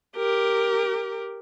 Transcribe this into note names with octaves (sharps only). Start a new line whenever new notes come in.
G4 A#4